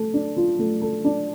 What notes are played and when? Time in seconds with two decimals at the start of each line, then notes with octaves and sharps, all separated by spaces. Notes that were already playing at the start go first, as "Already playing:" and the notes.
Already playing: A3 A4
0.14 D4
0.37 F4
0.59 A3
0.82 A4
1.04 D4